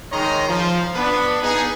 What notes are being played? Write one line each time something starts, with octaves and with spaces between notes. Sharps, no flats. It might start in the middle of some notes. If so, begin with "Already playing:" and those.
D#3 G#3 C#5 D#5 A#5 C6
F3
B3 D4 B4
B3 D#4 G#4